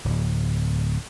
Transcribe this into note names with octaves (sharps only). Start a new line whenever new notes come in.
D1